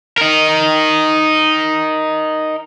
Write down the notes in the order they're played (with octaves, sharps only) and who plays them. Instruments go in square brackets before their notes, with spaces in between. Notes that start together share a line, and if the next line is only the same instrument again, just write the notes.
[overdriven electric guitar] D#4 A#4